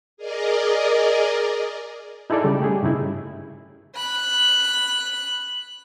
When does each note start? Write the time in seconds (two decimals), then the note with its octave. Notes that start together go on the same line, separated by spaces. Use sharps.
0.17 G#4 A#4 D5 D#5
2.30 D#4 E4 G#4 A4 D5
2.44 C#3 G3
2.60 A3 G4 G#4
2.83 G2 C#3 D#4 E4
3.96 B5 F#6